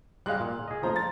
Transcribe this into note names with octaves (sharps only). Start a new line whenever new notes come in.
G3 G#3 F5 F#6
A#2
G#4 D#5
F3 A3 C5 A#5
A6